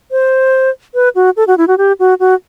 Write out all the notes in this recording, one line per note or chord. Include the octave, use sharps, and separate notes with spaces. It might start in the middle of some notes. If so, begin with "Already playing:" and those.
C5
B4
F#4
A4
F#4
E4
F#4
G4
F#4
F#4